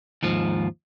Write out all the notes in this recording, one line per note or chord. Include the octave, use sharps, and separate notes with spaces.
D#2 G#2 F3